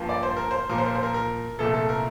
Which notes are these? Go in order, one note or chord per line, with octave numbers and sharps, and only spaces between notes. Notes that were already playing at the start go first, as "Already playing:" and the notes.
Already playing: G2 F3 A#3
D5
C5
A#4
C5
A#2 F3 A#3 A#4
C5
A#4
C5
A#4
A#4
C2 A#2 F3 A3 A4
A4
A#4